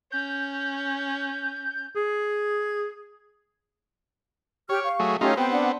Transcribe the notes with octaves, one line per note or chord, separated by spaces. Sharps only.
C#4 G6
G#4
G4 C#5 G5 F6
F5 C#6
F#3 A3 G#4
A3 C#4 D#4 F4 G4
B3 C4 G5 C6
D4 F#5